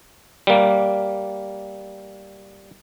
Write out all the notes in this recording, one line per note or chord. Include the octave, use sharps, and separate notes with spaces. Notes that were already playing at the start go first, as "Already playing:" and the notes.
G3 A#3